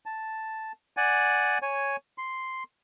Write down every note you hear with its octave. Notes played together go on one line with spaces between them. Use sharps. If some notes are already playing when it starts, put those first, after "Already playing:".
A5
D5 F#5 G#5
C#5 G#5
C6